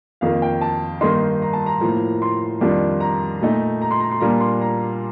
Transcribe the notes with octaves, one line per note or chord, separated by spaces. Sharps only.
F2 D#3 A#3 F5
G5
A5
G2 D#3 A#3 D#4 C6
A#5
A5
A#5
A2 F3 A#3
C6
F2 D#3 G3 D4 F4
A#5
A#2 A3 D#4
A#5
C6
A#5
C6
A#2 G3 A#3 D4 F4 A#5
C6
A#5